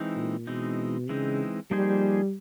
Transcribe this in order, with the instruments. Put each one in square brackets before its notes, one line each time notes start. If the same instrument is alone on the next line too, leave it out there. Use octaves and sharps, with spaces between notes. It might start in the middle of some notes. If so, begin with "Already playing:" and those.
Already playing: [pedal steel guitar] E3 G#3 C4 D#4
[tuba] A#2
[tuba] B2 [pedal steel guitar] E3 G#3 C4 D#4
[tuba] C#3 [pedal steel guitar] E3 G#3 C4 D#4
[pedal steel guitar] F3 A#3 D#4 G#4 C5 [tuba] G3